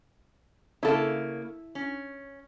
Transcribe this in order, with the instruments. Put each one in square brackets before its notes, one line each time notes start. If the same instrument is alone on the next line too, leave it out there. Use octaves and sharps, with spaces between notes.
[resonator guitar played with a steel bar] C#3 A#3 [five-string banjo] E4 A4
[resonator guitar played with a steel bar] C#4